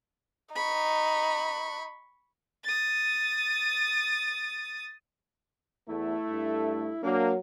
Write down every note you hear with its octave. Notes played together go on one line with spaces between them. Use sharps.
D#4 B5 C#6
D#6 A6
E2 A3 E4
G2
F#3 A#3 D4